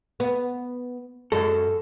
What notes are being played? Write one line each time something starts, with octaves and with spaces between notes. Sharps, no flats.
B3
F#2 G#3 A4